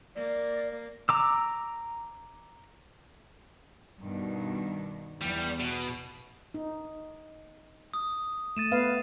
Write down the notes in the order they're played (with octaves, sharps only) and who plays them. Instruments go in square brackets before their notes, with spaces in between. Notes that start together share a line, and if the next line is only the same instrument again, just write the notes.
[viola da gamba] A#3 [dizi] D5
[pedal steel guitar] A#5 D6 E6
[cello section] G2 B2 D#3
[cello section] E2 [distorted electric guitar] G3
[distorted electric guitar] B2
[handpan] D#4
[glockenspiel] D#6
[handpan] A3 [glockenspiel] A6 D#7 E7
[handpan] B3 B4 F5